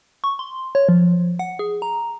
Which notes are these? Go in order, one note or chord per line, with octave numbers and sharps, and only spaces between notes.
C#6
C6
C#5
F3
F#5
G#4
A#5